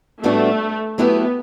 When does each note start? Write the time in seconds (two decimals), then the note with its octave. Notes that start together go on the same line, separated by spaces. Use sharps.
0.23 A2 G3 A3 B3 D4 F#4
0.98 F#3 A3 B3 E4 G4 B4